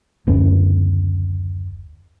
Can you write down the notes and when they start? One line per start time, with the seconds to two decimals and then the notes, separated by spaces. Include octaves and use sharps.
0.27 F#1 D2 B3 C#4